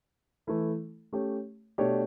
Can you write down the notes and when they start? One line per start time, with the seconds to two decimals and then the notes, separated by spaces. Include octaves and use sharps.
0.47 E3 A3 E4 A4
1.13 A3 C#4 G4 C#5
1.78 B2 A3 D4 G4 C#5